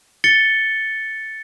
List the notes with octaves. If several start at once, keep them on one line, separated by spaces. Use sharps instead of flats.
A6 C#7 G7